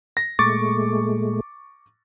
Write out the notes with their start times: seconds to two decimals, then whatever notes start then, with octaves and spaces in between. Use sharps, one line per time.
0.17 A#6
0.39 A#2 G#3 A3 C#6 D6 A6